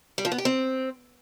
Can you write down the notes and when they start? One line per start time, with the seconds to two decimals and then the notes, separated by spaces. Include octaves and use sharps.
0.18 G3
0.25 F3
0.32 B3
0.38 G4
0.45 C4